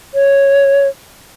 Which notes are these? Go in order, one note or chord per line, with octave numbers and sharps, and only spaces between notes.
C#5